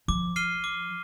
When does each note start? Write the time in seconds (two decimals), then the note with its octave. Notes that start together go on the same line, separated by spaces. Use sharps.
0.08 F3 D6
0.36 F6 C7 D#7 G7
0.64 D6